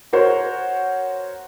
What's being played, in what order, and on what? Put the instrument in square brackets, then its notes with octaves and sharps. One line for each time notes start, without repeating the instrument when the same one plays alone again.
[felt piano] F#4 A#4 C5 C#5